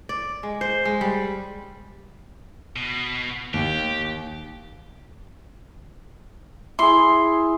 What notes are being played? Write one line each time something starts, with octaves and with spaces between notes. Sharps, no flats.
D5
G#3
C5
G#3
G3
B2
D#2 G4
E4 G#4 C6